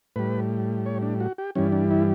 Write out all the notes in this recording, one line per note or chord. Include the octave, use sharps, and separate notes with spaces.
A2 G3 B4
C#5
D4
F#4
G4
G2 E3 G3 C#4
D4
E4